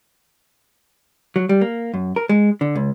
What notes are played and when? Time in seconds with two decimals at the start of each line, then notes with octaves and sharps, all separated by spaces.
1.36 F#3
1.49 G3
1.61 A#3
1.94 F#2
2.16 A#4
2.29 G#3
2.61 D3
2.75 C#2